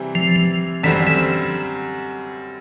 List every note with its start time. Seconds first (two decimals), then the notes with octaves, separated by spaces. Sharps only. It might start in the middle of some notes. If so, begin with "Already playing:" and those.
Already playing: C3 E3 G3 C4
0.15 F3
0.83 F#2 D3 E3 G3 C4
1.07 E3